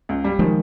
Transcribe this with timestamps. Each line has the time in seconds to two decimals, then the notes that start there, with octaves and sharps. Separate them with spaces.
0.09 C#2
0.24 G3
0.39 D#3 F3 G#3